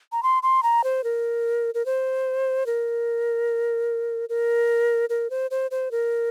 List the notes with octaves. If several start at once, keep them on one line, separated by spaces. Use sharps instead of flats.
A#5
C6
C6
A#5
C5
A#4
A#4
C5
A#4
A#4
A#4
C5
C5
C5
A#4